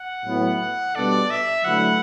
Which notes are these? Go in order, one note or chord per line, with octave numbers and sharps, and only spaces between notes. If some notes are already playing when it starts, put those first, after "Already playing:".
Already playing: F#5
A2 F#3 B3 E4
B2 G3 B3 D4 A4 D5
E5
D3 F#3 A3 E4 B4 F#5